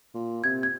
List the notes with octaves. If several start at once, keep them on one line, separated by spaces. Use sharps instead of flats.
A#2
C3 G#6
G#6